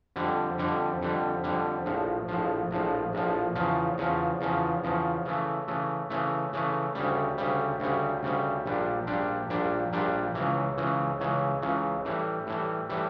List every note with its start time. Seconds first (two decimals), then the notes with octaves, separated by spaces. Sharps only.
0.16 F2 D3 G3
0.58 F2 D3 G3
1.02 F2 D3 G3
1.44 F2 D3 G3
1.86 A#1 A2 F3
2.28 A#1 A2 F3
2.71 A#1 A2 F3
3.13 A#1 A2 F3
3.55 E2 C#3 F3
3.98 E2 C#3 F3
4.41 E2 C#3 F3
4.84 E2 C#3 F3
5.25 C#3 E3 A3
5.68 C#3 E3 A3
6.10 C#3 E3 A3
6.53 C#3 E3 A3
6.95 D2 C#3 G3
7.38 D2 C#3 G3
7.80 D2 C#3 G3
8.23 D2 C#3 G3
8.66 A#1 A#2 G3 D4
9.07 A#1 A#2 G3 D4
9.50 A#1 A#2 G3 D4
9.93 A#1 A#2 G3 D4
10.35 C#2 C#3 E3
10.78 C#2 C#3 E3
11.20 C#2 C#3 E3
11.62 C#2 C#3 E3
12.05 A2 E3 G3
12.47 A2 E3 G3
12.90 A2 E3 G3